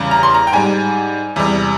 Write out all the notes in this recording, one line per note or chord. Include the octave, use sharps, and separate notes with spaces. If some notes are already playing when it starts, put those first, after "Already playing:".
Already playing: E2 C#3 G3
A#5
C6
A#5
G5
G#2 G3 G#5
E2 C3 G3